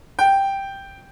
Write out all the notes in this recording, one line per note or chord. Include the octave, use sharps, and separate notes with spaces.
G5